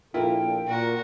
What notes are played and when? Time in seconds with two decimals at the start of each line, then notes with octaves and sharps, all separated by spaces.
0.14 A#1 A#2 A#3 E4 F4 A4 G5
0.67 A#2 F#4 A#4